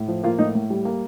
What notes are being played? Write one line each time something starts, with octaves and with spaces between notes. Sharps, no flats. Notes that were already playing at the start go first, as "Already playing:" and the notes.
Already playing: A2
F3
A#3 F4
A2 D#4
A2
G3
A#3